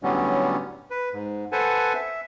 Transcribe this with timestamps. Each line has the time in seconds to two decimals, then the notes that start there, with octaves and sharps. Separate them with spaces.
0.03 A2 D3 F#3 G3 B3 C#4
0.91 B4
1.13 G#2
1.52 A4 B4 C5 F#5 G#5 A5
1.95 E5